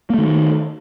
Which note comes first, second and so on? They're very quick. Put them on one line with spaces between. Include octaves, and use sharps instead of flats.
A#3 A3 D#3